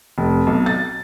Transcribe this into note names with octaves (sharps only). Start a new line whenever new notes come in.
F1
B1
A6